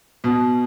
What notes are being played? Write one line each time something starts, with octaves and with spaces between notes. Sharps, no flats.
B2